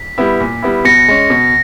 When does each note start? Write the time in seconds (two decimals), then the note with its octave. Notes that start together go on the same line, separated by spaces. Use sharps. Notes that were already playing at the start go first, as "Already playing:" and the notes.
Already playing: B6
0.18 G3 B3 E4
0.40 A#2
0.62 G3 B3 E4
0.85 B2 A#6 C#7
1.08 G#3 C#4
1.30 B2